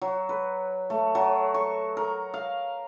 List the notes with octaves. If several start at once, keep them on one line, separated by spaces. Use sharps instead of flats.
F#3
B4
A3
F#3
C#6
A#4
F5